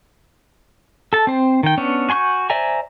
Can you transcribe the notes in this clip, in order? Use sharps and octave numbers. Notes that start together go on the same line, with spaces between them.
A4 A5
C4 C5
D#3 G5
B3 C#4 D4
F#4 G#5 C6 C#6 G6
C5 D5 E5 G#5 A#5